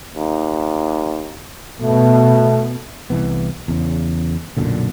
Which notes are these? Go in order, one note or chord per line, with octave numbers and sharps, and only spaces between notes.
D#2
B2 A3
C2 E3 B3
E2 C#3
B1 F#2 A#2 D3